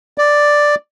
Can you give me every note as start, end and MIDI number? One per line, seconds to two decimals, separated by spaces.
0.18 0.75 74